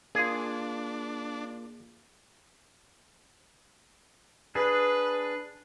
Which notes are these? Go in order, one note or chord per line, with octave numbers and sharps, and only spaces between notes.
A#3 D4 F4 G#4
D4 G#4 B4